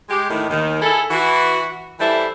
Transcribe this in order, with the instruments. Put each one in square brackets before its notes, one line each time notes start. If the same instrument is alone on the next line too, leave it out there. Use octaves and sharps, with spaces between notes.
[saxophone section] G#3 G4
A2 D#3
D#2 D#3
E4 G#4 A4
E3 F#4
E3 G3 E4 A4 C5